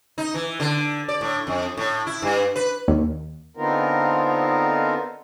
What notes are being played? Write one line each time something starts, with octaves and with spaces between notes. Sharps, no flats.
D#4
E3
D3
D5
A2
F2
A2
E4
G2
B4
D#2
D3 B3 C4 D#4 F4 A#4